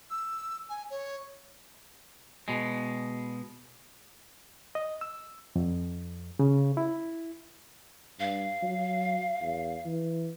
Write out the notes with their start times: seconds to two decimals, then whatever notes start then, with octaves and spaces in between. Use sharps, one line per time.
0.10 E6
0.69 G#5
0.90 C#5
2.48 B2 G#3
4.75 D#5
5.01 E6
5.56 F2
6.39 C#3
6.77 E4
8.19 G2 F5
8.62 F#3
9.41 E2
9.85 E3